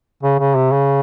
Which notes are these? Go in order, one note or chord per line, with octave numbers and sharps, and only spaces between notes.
C#3
C#3
C3
C#3